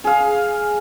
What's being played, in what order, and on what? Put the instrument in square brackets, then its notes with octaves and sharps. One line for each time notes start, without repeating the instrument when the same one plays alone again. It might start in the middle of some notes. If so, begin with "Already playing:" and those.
[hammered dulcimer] G#4 F5